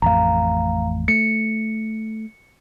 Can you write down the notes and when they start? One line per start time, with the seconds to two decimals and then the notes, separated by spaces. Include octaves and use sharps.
0.02 A1 F2 A3 F5 A#5
1.08 A3 C#7